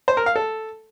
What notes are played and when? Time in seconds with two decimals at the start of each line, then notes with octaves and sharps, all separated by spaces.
0.08 C5
0.17 A#4
0.26 F5
0.36 A4